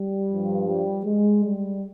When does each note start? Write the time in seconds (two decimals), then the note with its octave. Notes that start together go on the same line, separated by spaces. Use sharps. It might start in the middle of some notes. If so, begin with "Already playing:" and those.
Already playing: G3
0.30 G2 F3
0.68 G3
1.05 G#3
1.45 G3